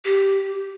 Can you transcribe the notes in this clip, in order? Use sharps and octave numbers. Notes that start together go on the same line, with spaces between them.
G4